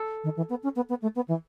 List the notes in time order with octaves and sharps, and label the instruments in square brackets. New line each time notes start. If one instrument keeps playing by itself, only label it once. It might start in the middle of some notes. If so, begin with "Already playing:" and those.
Already playing: [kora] A4
[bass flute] D#3
E3
B3
C#4
B3
B3
A3
B3
E3